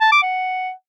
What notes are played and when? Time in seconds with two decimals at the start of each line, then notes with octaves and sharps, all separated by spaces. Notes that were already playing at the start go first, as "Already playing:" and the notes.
0.01 A5
0.12 D6
0.23 F#5